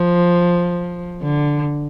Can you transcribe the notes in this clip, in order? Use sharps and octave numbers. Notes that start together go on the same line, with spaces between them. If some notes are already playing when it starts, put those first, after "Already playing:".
Already playing: F3
D3